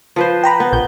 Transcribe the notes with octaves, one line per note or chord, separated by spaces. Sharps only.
F3 B4 C5
G5 A#5 B5
B3
A#1 G6